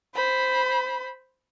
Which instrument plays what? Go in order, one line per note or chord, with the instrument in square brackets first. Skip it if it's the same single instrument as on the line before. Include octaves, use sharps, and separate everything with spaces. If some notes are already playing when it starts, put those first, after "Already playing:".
[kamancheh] C5 B5